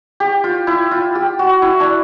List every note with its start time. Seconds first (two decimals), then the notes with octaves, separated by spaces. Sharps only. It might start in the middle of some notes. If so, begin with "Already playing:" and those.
0.20 G4
0.44 F4
0.67 E4
0.91 F4
1.15 G4
1.39 F#4
1.62 E4
1.80 D4